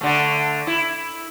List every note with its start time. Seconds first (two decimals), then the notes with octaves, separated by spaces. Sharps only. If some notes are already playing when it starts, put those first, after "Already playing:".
0.01 D3 A3
0.67 E4